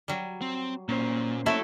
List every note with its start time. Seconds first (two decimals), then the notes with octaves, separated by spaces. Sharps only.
0.08 F#3 G3
0.41 C4
0.89 A#2 A#3 C#4 C5
1.46 A3 E4 F#4 A4 C#5